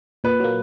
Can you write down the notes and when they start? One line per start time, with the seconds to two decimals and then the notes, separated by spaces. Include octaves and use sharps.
0.24 A#2 B4
0.40 F#3 A#3